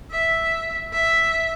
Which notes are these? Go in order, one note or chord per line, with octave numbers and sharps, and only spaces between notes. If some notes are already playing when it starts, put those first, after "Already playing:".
E5
E5